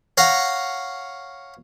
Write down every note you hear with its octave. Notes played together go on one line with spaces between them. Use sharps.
C#5 F5 F#5 A#5